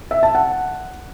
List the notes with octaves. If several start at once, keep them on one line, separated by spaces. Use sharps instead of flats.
E5
A5
F#5